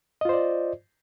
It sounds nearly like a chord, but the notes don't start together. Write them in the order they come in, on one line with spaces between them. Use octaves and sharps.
D#5 F4 C5 D5